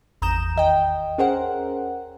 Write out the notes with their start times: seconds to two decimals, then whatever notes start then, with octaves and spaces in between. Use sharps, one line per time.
0.22 G#1 E2 A#5 D#6 G6 E7
0.56 D#2 D#5 G5
1.18 C#4 G#4 A#4 C5 F#5